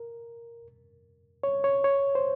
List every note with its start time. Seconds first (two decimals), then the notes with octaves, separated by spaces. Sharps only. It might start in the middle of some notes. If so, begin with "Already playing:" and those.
Already playing: A#4
1.43 C#5
1.64 C#5
1.84 C#5
2.15 C5